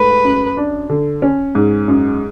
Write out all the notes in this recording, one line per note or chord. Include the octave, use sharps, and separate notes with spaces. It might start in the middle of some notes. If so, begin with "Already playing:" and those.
Already playing: G#2 A3 B4
F#2
D4
D3
C#4
G#2
F#2